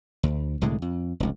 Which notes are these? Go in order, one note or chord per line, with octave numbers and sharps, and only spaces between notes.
D2
C2 A2 D3 G#3
F2
F1 C#2